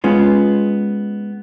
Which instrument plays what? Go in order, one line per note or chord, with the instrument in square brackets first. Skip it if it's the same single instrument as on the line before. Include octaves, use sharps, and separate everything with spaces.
[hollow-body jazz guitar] G#3 B3 C#4 F4